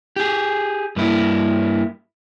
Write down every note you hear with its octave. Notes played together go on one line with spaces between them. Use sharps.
G4 G#4
G2 A#3 E4